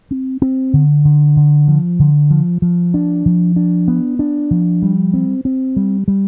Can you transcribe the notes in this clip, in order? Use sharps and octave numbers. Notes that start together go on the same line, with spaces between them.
C4
C4
D3
D3
D3
F3
D3
F3
F3
D4
F3
D4
B3
D4
F3
G3
C4
C4
G3
G3